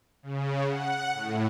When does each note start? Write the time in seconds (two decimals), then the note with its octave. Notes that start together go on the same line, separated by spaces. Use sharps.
0.23 C#3
0.66 F#5
1.13 A2